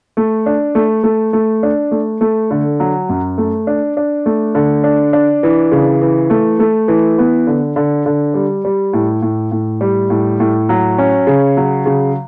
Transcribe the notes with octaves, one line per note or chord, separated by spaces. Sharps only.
A3
D4
A3
A3
A3
D4
A3
A3
D3
F#3
F#2
A3
D4
D4
A3
D3
D4
D4
E3
C#3
E3
A3
A3
E3
B3
D3
D3
D3
G3
G3
A2
A2
A2
G3
A2
A2
F#3
C#4
C#3
F#3
C#3